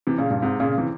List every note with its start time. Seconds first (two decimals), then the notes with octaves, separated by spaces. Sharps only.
0.07 C3 E3
0.18 A#2 C#3
0.30 G2 A#2
0.42 G#2 C3
0.60 A#2 C#3
0.78 C3 E3